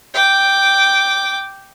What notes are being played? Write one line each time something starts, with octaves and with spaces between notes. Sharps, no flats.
G5 D6